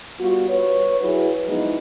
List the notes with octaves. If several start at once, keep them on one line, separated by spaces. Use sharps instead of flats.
G3 B3 F4 F#4
B4 C#5
F#3 E4 F#4 G#4 B4
F3 F#3 G#3 B3 D#4 E4